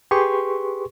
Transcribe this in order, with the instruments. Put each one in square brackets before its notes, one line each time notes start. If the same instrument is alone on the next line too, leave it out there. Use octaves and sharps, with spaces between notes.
[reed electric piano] G4 G#4 B4 C6 C#6